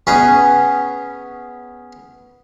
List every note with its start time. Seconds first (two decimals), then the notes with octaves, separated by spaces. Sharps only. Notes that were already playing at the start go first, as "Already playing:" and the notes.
0.07 B3 C#4 G#4